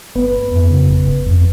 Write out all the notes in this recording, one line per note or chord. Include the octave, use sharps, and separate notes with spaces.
G1 B3 B4
G1
F2
C#3
G1
G1
F2